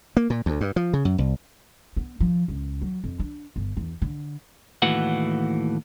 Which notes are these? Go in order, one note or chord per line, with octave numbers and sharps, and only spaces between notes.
A#3
A#2
D2
G2
F3
C#3
F#2
C2
B3
F3
C#2
F#3
F2
D4
G1
E2
D3
D#2 A2 E3 F#4 F#5